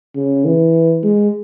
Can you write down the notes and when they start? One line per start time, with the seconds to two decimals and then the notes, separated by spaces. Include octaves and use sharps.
0.16 C#3
0.45 E3
1.03 G#3